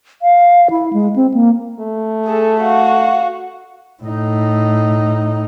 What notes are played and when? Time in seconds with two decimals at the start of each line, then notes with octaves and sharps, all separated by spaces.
0.22 F5
0.70 E4
0.93 G#3
1.16 C4
1.34 A#3
1.80 A3
2.25 G#4 A4
2.60 F#4 F5
4.03 A2 D#4